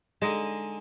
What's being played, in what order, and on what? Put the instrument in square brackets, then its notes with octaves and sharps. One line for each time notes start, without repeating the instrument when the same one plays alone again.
[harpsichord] D3 D#4 A5 [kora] G#3